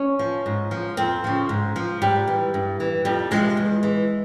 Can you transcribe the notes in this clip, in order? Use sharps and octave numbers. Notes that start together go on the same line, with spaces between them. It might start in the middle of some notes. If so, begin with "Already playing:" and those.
Already playing: C#4
F3
G#2
F3
F2 C4
C#3 F3
G#2
F3
G#2 G3
E3
G2
E3
F2 G3
C3 F3 G#3
E2
E3